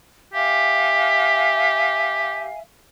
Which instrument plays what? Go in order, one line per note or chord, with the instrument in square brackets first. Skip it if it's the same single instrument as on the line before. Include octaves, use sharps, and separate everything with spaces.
[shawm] G4 [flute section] E5 F5 G#5